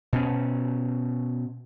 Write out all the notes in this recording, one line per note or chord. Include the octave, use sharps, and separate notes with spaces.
B2 C#4